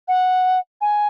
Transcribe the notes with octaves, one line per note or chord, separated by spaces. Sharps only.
F#5
G#5